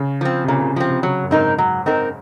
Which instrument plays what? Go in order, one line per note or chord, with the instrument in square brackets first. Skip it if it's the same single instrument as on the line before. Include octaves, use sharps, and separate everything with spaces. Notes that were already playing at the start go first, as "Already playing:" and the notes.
Already playing: [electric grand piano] C#3
[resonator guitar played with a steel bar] F3 C4
[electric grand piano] C3
[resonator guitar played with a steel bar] A#2 [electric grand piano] C#3
[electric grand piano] C#3
[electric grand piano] C3 [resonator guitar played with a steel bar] F3 C4
[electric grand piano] C3
[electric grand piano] C#3 [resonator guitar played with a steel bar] F#3
[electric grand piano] F#2
[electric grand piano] G#2 [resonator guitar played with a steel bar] C4 D#4 A#4
[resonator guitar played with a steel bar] F#3
C4 D#4 A#4